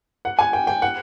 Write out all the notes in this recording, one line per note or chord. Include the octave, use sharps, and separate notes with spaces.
F#5
G#5
G5
G5
F#5